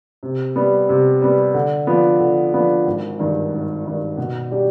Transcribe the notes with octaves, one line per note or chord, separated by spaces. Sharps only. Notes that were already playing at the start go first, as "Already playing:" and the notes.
C3
G3 B3
C3
G3 B3
D3
F3 B3 D4
D3
F3 B3 D4
G#1
G2 D#3
G#1
G2 D#3
B2
G3 D4 G4 D5